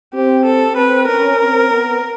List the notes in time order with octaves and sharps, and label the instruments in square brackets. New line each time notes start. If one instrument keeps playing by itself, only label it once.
[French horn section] C4 [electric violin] G4
[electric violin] A4
[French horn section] C4 [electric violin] B4
[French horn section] C#4 [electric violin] A#4
[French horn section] C4
B3